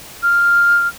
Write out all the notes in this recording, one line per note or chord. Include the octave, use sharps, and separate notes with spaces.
F6